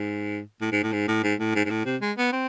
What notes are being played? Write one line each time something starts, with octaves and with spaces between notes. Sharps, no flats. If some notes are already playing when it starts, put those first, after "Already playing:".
Already playing: G#2
A2
G#2
A2
G#2
A2
G#2
A2
G#2
G#2
A2
C3
G#3
B3
C4